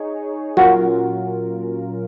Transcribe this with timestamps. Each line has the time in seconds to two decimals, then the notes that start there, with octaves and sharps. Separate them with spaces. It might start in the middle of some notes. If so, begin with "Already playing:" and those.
Already playing: D#4 G#4 C#5
0.57 A#2 F#3 C#4 F4 F#4 A#4